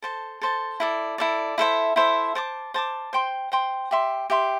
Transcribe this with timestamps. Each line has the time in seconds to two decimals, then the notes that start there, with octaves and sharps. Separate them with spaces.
0.02 A4 C5 A5
0.41 A4 C5 A5
0.80 E4 A4 D5
1.18 E4 A4 D5
1.58 E4 A4 C5 E5
1.96 E4 A4 C5 E5
2.35 C5 A5 D6
2.74 C5 A5 D6
3.13 C5 G5 C6
3.52 C5 G5 C6
3.91 G4 E5 C6
4.30 G4 E5 C6